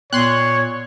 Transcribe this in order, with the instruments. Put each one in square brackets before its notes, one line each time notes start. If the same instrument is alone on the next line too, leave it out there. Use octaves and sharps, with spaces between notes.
[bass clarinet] A#2 [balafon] B3 [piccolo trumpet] C#5 [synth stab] C6 F#6